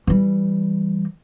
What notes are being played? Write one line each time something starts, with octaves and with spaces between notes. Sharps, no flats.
E3 G3